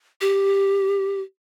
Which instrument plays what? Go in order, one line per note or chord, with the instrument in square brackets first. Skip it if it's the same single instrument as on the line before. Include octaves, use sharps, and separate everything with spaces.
[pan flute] G4